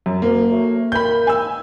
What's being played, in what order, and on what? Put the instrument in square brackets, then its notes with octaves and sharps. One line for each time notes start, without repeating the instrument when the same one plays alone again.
[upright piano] F#2
[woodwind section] D2 [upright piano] A#3
[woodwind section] F#3 A3
[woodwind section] D#3 E3 A#3 [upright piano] B5 G6
[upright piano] G#5 E6